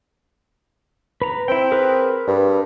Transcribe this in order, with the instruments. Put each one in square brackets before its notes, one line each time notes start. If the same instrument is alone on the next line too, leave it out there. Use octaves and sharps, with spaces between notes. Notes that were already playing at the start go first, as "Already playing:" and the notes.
[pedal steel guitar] B4 A#5
[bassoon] C4 [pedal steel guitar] E4 G5
[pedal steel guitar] G#4 A#4 B4
[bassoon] G2